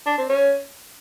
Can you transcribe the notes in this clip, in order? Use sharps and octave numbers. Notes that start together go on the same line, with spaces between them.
D4
C4
C#4